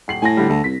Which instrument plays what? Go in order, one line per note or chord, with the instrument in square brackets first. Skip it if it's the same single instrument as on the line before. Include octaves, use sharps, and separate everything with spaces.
[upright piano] D#1 C7 F#7
[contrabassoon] A2 [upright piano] G#5 A#6
[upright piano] D3 G3
[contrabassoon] D2 [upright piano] A4
[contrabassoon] C2 [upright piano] B6